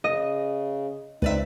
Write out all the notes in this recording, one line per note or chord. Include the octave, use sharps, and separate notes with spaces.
C#3 D#5
C#2 C4 D#4 B4 D5 E5